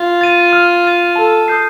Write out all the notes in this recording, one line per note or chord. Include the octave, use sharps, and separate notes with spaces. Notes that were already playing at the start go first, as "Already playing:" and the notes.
Already playing: F4
A6 D#7
F6
A6 D#7
A4 A5
D#6 G6 C7